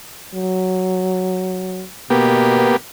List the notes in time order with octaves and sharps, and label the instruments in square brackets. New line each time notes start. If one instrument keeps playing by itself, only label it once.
[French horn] F#3
[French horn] B2 [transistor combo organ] A#3 B3 G4